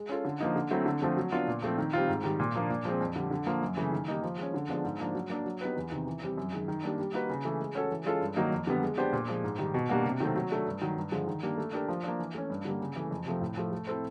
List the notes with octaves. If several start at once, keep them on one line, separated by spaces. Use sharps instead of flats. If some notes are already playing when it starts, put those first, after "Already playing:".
Already playing: G#3
C#4 F4 A4
D3
F3 A#3 D#4
D3
F#3 A3 C4 E4
D3
F3 A3 C4
F#3
B3 D4 F4
A#2
F3 A3 C4
D#3
G3 C4 F4
G#2
D#3 G3
A#2
F3 A#3 D4
A#2
F3 G#3 C4
F2
D3 G3
D3
F3 A#3
F#2
C#3 E3 A3
D#3
G3 A#3 D#4
F3
G#3 C#4
D3
F3 G#3 B3 D4
G#2
F3 A#3 D4
F#3
A#3 D4
F#3
B3 D#4 G4 B4
E2
C3 D#3
E3
G3 C4
F#2
D#3 G#3
D#3
G3 A#3 D4
G3
A#3 D#4 F#4 B4
C#3
E3 A3
G#3
C#4 F#4 A4
E3
G#3 C#4 F4 A4
G2
D#3 F#3 A#3 D#4
F2
D3 G3 B3
G#3
B3 D4 G4 C5
A#2
F3 G#3
G#2
D#3 G3
B2
G3 A#3 D4 F#4
C3
D#3 F#3 A3 C4
F#3
A3 D4
G2
D#3 F#3
G2
D3 F3 G#3
D#3
G3 A#3 D4
A3
D4 G4 A#4
F3
A#3 D4
E3
A3 C#4
G2
D3 G3 A#3
C#3
E3 A3
F2
C3 F3 A3 C4
A2
F3 A3
A3
C4 E4 A4 C5